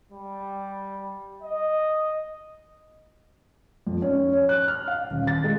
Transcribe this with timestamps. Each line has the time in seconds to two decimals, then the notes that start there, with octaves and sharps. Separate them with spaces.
0.12 G3
1.42 D#5
3.87 F2
4.02 C#4
4.33 C#5
4.49 F#6
4.68 F6
4.88 F5
5.11 D#1
5.27 A6
5.44 G#3